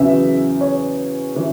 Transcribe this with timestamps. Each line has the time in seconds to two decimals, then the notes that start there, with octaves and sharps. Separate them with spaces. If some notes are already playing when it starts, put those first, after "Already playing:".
Already playing: E2 C#3 F#3 E5
0.61 C#5
1.34 C#3 E3